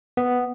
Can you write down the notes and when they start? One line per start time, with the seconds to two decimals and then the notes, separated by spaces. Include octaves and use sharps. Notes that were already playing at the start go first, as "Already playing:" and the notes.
0.17 B3